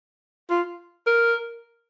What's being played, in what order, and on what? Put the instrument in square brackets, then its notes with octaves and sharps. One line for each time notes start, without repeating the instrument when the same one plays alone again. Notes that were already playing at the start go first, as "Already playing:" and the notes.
[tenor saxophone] F4
A#4